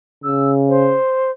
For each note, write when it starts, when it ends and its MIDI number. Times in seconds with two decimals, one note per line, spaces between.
0.24 0.97 49
0.24 0.51 88
0.69 1.30 72